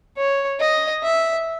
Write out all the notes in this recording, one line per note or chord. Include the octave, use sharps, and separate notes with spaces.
C#5
D#5
E5